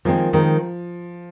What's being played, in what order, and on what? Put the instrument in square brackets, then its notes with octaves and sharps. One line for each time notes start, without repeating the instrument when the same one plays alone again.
[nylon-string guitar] D#3 G#3 C4 [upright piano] F3
[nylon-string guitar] D#3 G#3 C4